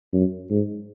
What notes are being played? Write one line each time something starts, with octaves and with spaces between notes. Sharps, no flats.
F#2
G#2